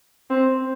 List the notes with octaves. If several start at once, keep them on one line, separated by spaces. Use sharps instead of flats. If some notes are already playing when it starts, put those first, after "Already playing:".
C4